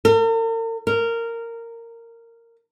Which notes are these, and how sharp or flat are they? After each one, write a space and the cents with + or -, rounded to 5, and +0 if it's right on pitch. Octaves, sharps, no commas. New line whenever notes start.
A#4 -45
A#4 -15